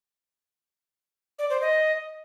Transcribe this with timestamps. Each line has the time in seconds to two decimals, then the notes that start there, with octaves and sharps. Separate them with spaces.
1.39 D5
1.50 C5
1.61 D#5